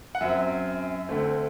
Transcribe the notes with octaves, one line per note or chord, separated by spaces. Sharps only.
F#5
F#2 F#3 C4 E5
D2 D3 A3 C4